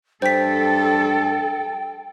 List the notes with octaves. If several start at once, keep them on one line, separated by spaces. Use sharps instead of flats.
G2 A4 C5 G5 B6